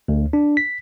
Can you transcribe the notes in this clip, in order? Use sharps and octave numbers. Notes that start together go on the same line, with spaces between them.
D2
D4
B6